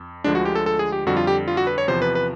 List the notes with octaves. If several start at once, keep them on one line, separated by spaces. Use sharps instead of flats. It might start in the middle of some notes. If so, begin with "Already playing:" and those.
Already playing: F2
D2 D3 F3 G#3 D4
F#4
G4
A4
A4
G#4
G4
F2 D3 G3 F#4
F4
G4
F4
F#4
B4
C#5
E2 C3 F3 C5
B4
B4